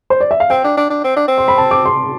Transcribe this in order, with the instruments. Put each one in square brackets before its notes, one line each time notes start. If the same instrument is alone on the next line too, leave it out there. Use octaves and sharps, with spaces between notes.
[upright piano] C5
D5
E5
F5
[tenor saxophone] C4 [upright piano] G5
[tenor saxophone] D4
D4
D4
C4
D4
C4
[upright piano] C6
B5
A5
D6
C6